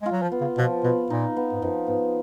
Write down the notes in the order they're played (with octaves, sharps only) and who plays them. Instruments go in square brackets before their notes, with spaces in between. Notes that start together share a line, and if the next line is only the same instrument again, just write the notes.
[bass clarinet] G#3 [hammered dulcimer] F4
[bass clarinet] F#3
F3
[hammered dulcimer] B3
[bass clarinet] C#3
[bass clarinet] B2 [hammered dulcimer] F3
[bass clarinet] B2 [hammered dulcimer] B3
[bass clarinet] A#2 [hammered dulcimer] D#4
[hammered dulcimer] B3
[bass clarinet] G#2
[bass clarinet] F#2 [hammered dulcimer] F3
[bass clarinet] G#2 [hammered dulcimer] B3